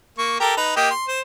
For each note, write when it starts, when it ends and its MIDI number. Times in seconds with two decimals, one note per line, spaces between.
0.18 0.39 58
0.18 0.39 85
0.40 0.55 67
0.40 0.55 69
0.40 0.55 70
0.57 0.72 63
0.57 0.72 71
0.76 0.90 58
0.76 0.90 67
0.76 0.90 75
0.91 1.06 84
1.08 1.21 72